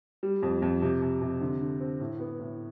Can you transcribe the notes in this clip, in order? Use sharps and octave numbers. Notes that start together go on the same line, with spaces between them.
G3
F2
F2
C3
C3
C3
D3
D3
C4
A2
B3
A2